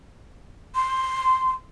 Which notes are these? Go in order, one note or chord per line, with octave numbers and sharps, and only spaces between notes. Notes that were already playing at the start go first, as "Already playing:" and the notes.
C6